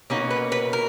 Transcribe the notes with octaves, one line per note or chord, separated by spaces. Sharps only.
B2 A#3 C#4 D#4
B4
B4
A#4